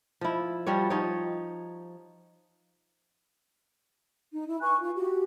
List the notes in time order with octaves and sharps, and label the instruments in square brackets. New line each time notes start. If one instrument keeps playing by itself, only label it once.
[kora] F3 E4
F3 G3 F#4 C#5
F3 D#4 C#5
[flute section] D#4
E4
B4 G#5 C#6 F#6
F4
F#4 G4